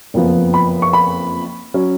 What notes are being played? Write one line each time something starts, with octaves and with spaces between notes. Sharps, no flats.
F#1 F2 F3 B3
B5
C#6
B5
F#3 C#4